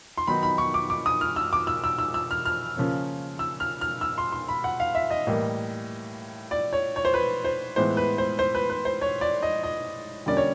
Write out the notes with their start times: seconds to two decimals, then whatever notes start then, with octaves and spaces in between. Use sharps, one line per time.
0.17 C6
0.27 D#3 F#3 B3 D#4 B5
0.43 B5
0.58 C#6
0.74 D6
0.90 D6
1.06 D#6
1.21 F6
1.36 E6
1.53 D6
1.67 E6
1.84 E6
1.98 E6
2.14 E6
2.31 F6
2.45 F6
2.77 C#3 F3 A#3 C#4
3.39 E6
3.60 F6
3.81 F6
4.01 E6
4.18 C6
4.32 C6
4.48 B5
4.64 F#5
4.80 F5
4.95 E5
5.10 D#5
5.27 A2 E3 G3 A#3
6.51 D5
6.73 C#5
6.96 C#5
7.05 C5
7.14 B4
7.44 C5
7.76 A2 E3 G#3 B3 C5
7.97 B4
8.18 C5
8.39 C5
8.55 B4
8.70 B4
8.85 C5
9.01 C#5
9.21 D5
9.43 D#5
9.63 D#5
10.26 D3 G3 A#3 C#4 D5
10.37 C#5